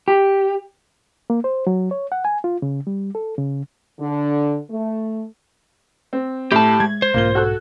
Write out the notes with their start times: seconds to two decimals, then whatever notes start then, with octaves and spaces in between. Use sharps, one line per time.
0.08 G4
1.30 A#3
1.44 C5
1.67 F#3
1.91 C#5
2.12 F#5
2.25 G#5
2.44 F4
2.62 C#3
2.87 G3
3.15 A4
3.38 C#3
4.00 D3
4.70 A3
6.13 C4
6.52 A2 G4 A5
6.80 G#3 G#6
7.02 C5
7.14 B1 G#2 A#3 F4 G7
7.35 F#4 A4 F#6